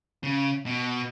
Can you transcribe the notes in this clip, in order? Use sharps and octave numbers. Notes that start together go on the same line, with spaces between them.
C#3
B2